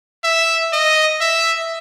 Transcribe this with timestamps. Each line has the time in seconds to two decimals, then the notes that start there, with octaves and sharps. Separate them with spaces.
0.24 E5
0.73 D#5
1.21 E5